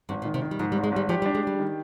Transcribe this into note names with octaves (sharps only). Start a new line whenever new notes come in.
G#1 G2
A#2
D#3
C3
D#3
G3
G#2 F3
G3
G#1
G#3
G#1 G3
F3 G4
G3
D4
G#3
G3 G4
D#3